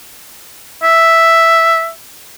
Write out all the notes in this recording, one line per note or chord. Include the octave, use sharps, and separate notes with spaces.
E5